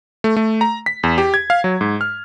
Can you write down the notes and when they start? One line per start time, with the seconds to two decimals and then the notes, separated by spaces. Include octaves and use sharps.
0.24 A3
0.36 A3
0.61 A#5
0.86 B6
1.03 E2
1.18 G4
1.34 G#6
1.50 F5
1.64 F#3
1.81 G#2
2.01 F6